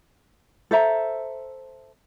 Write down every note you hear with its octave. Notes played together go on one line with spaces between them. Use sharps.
A4 C5 E5 A#5